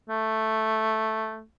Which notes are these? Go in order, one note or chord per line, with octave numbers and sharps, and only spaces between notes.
A3